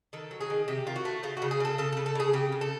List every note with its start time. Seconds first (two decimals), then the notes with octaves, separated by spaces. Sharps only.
0.13 D#3 A4
0.31 F#3
0.41 G#4
0.50 D#3
0.68 C3 G4
0.87 D#3 F4
0.96 F#4
1.05 A3
1.23 C#3 F4
1.37 F#4
1.42 C#3
1.51 G#4
1.60 C#3 A4
1.78 C#3 A4
1.93 C#3 A4
2.06 A4
2.15 C#3 G#4
2.33 C#3 G4
2.52 C#3
2.61 A4